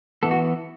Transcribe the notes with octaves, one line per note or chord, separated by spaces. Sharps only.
E3 B3 A4
F#4